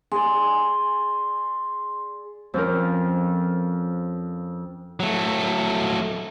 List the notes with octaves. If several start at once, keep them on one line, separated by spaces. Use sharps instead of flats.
G#4 D5 C6
F2 F3 C#4 A#4
F#3 A3